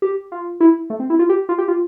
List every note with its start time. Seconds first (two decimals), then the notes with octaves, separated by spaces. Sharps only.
0.02 G4
0.32 F4
0.60 E4
0.90 A3
1.00 C4
1.10 E4
1.19 F4
1.29 G4
1.49 F4
1.58 G4
1.68 F4